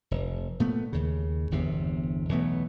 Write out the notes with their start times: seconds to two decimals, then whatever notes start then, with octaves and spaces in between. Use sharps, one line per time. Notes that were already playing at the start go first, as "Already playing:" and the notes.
0.11 F1
0.60 A#2 A3 B3
0.93 D#2 C#3
1.51 G1 E2 C3
2.29 B1 E3 A3 B3